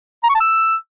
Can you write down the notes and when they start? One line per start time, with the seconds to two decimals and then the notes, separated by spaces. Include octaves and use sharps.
0.24 A#5
0.29 C#6
0.35 A5
0.41 E6